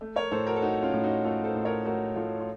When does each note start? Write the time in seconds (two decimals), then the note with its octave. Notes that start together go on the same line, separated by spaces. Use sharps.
0.01 A3
0.16 A#4 C#5
0.31 A2 A4 C5
0.47 F#4 A#4
0.56 A4
0.62 A3 D#4 F#4
0.83 C#4 F4
0.93 A2
1.03 D#4 F#4
1.24 A3 F4 A4
1.44 A4 C5
1.55 A2
1.65 A#4 C#5
1.85 A3 F#4 A#4
2.16 A2 F4 A4
2.40 F4